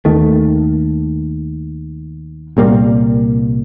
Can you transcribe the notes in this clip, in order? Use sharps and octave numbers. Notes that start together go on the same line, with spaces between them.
D#2 D#3 A3
C2 A#2 G3 A#3